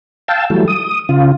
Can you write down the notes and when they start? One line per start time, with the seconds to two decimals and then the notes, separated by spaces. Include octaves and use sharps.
0.28 F5 G5 A5 E6
0.50 E3 F#3 G3 A3
0.68 D#6
1.09 C#3 F4